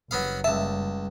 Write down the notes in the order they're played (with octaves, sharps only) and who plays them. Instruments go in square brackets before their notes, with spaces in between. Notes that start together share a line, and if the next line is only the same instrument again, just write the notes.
[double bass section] F#1 G3 [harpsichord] F#3 B3 F5
[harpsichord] C#2 A5 [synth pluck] E5